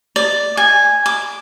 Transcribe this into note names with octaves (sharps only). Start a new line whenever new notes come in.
D5
G#5
D6